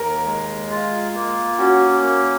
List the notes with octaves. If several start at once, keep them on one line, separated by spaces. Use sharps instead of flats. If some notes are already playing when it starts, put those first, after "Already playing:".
Already playing: D#2 A#4
G#3
F4
A#3
C#4 F#4
A#3